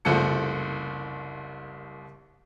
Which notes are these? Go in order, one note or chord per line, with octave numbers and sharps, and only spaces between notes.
F#1 C2 F3 A3 A4 C#7